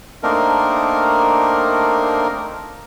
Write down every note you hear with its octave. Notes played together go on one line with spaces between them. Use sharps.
A3 A#3 C4 D4 D#4 A#4